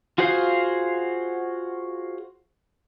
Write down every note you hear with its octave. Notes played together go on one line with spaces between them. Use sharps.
F4 F#4 G#4 C5 F5